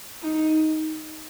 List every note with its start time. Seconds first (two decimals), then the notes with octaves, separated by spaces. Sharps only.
0.22 D#4